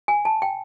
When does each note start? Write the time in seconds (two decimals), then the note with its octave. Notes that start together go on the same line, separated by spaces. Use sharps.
0.08 G#5
0.25 A5
0.42 G5